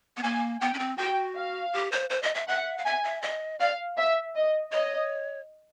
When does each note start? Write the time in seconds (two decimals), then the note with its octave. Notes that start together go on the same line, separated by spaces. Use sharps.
0.17 B3
0.23 A#3 G#5
0.60 B3 G5
0.74 C#4
0.79 C4
0.98 F#4 G5
1.36 F5
1.73 G4
1.92 C5
2.10 C5
2.23 D#5
2.35 E5
2.48 E5 F#5
2.78 F5
2.85 E5 G#5
3.04 E5
3.22 D#5
3.60 D5 F5
3.97 E5
4.36 D#5
4.72 C#5 D#5